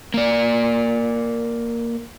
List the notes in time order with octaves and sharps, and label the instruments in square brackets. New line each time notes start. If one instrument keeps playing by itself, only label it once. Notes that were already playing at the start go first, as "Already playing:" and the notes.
[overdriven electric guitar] A#3 D5